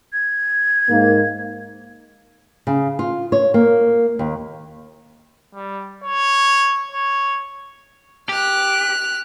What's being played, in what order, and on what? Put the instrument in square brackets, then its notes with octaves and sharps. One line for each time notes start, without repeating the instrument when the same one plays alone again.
[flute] G#6
[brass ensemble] G#2 A#3
[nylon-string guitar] C#3
F4
C#5
A#3
D#2
[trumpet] G3
C#5
C#5
[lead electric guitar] G4 [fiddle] F6 F#6